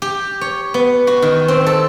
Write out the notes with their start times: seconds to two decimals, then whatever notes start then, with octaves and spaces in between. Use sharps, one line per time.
0.02 G4
0.41 C#5
0.74 B3
1.07 F#4
1.22 D#3
1.48 C4
1.66 A4